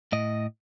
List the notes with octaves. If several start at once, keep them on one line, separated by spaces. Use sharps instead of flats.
A2 D#5